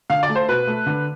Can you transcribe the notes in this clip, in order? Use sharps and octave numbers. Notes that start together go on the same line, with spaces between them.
D3 F5
D5
A3
C5
B2 B4
A3
D3